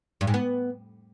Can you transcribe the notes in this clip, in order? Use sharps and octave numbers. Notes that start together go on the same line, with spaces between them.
G2
G#2
B3